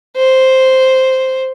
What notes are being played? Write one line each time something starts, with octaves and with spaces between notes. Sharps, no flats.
C5